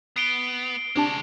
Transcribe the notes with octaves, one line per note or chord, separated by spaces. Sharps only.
B3 C7 D7 G7
D2 C3 G#3 D4 A5